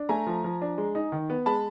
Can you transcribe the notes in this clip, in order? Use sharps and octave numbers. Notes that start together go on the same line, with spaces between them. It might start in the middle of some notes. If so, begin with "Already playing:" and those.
Already playing: D4
A3 G#5 A#5
F3
F3
D4
G#3
D#4
D#3
B3
G#3 A5 B5